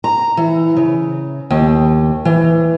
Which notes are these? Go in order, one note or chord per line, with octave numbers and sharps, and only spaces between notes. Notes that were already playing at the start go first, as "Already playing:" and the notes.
A#5
E3
C#3
D#2
E3